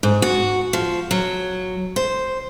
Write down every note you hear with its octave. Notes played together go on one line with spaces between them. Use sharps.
G#2
F#4
F3
F#3
C5